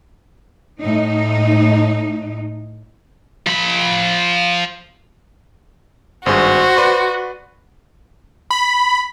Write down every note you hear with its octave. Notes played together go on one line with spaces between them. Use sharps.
A2 D#4
F3 B5
G#1 G2 F#4 G#4 C5
B4 D5 C6
B5